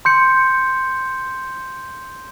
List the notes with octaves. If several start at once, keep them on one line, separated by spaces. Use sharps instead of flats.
C6 G6 C#7